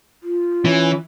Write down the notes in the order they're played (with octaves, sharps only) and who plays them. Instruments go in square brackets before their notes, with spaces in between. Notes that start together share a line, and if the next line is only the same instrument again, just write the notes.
[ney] F4
[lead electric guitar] E3 [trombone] C#4